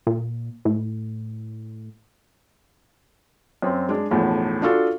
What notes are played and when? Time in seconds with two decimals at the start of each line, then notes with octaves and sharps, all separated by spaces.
0.07 A#2
0.65 A2
3.62 F#2 C4
3.89 G#3 D4
4.11 B1 E2 A2 F3
4.62 D4 F4 F#4 A4